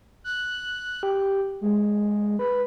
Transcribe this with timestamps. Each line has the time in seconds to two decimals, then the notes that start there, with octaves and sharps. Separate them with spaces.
0.24 F#6
1.03 G4
1.61 G#3
2.39 B4